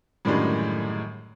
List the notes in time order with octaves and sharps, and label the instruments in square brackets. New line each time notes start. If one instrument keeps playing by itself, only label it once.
[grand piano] F#2 A2 D3 D#3 G3 G#3